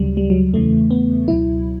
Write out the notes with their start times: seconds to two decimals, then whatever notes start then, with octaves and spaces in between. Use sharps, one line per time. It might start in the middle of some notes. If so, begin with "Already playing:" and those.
Already playing: D2 C#3 F#3 G3
0.17 G3
0.30 F#3
0.54 E2 C#3 E3 A3
0.91 B3
1.28 C#2 B2 F#3 E4